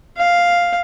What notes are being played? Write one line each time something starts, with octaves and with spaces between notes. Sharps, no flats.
F5